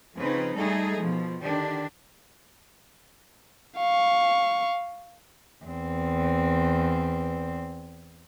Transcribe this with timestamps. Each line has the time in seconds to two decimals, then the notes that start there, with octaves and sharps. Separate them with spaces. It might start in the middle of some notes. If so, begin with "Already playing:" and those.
0.16 C#3 F3 C4 D#4 B4
0.54 G3 A3 D#4 G#4 A4
0.98 B2 F3
1.41 D3 D#3 D4 G4
3.78 F5 C#6
5.66 E2 C4